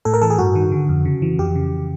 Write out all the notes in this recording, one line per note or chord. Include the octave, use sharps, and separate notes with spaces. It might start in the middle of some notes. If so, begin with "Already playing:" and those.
A2 A4
A#4
E3 A4
G#4
G2 F#4
D#3
D3
F2
C#3
E3
F2 G4
C#3